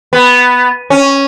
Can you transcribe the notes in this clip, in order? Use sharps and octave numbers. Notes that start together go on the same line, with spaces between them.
B3
C#4